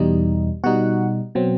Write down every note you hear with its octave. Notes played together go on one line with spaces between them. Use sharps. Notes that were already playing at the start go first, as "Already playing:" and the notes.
Already playing: E2 B2 G3 D#4
B2 G3 D#4 F#4 F#5
B2 F#3 C4